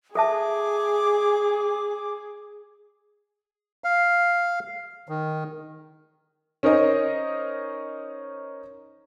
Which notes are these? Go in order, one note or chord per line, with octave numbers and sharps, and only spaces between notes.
G#4 A4 E5 A5 D6
F5
D#3
C#4 D#4 A#4 C5 D#5